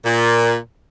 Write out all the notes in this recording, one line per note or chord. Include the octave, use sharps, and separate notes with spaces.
A#2